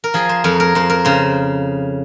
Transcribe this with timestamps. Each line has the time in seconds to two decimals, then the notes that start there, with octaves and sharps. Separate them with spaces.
0.04 A#4
0.14 F3 G#4
0.29 C5
0.44 F2 A#4
0.60 A#4
0.75 F2 C5
0.90 A#4
1.05 C#3 C5